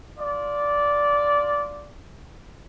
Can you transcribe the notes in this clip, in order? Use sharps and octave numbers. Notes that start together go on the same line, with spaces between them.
F4 D5